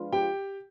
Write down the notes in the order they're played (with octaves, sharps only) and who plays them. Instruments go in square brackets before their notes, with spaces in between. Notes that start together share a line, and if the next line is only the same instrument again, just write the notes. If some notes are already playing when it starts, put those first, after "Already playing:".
Already playing: [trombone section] F3 G#3 D4 F4 B4
[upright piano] G4 G5